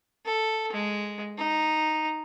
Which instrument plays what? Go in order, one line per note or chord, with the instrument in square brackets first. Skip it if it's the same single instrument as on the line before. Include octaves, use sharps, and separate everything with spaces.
[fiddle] A4
G#3
D#4